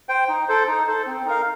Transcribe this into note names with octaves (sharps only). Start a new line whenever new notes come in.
C5 G5
D#4
A4 C5
D#4
A4 C5
C4
D#4 A#4 F5